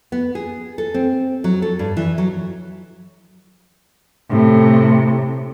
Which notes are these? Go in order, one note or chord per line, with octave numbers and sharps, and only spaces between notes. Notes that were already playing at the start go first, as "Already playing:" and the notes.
B3
G#4
A4
C4
F#3
A4
G2
E3
F#3
A2 C3